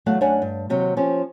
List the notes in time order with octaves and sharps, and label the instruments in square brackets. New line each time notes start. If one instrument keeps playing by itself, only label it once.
[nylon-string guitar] E2 F#3 A3 F5 F#5
F#2 D4 C#5 E5 F#5 G#5
G2
D#2 C3 F#3
F3 C#4 G4